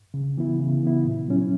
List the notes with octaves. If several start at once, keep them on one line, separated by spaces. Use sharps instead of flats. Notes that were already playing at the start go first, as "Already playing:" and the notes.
C#3
E3 B3 E4
C#3
E3 B3 E4
A#2
F#3 C#4 E4